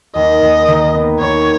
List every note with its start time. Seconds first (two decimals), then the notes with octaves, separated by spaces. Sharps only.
0.15 D#2 D#5
0.42 D#2
0.67 D#3
0.94 B3
1.20 D#2 C#5